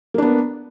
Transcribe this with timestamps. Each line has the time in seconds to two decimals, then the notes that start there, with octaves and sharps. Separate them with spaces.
0.14 A#3
0.18 D4
0.22 B3